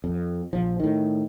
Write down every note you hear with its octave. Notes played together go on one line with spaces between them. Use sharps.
F2
A#1 F3
A2 D#3